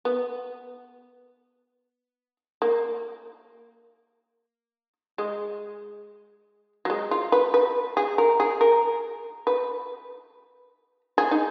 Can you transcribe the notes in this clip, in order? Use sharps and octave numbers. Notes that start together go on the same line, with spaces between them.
B3
A#3
G#3
F#3
G#3
F4
B4
B4
G#4
A#4
G#4
A#4
B4
G#4
D#4